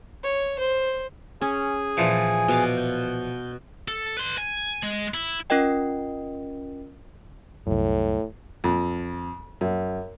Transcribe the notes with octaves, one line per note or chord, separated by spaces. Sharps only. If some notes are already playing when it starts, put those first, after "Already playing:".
C#5
C5
C#4 G#4 G#5
A#2 E3 F3
B2 F5 D6
G6
A4
B4 C6
G#5
G#3
E4
C#4 F4 A#4 D#5 G5
C2 F#2 A2
F2
F#2